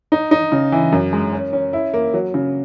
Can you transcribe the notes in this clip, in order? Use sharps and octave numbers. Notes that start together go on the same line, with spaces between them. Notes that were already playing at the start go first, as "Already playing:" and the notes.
D#4
D#4
C#3
E3
F#2
G#3
C#4
C#4
E4
A#3
F#3
C#3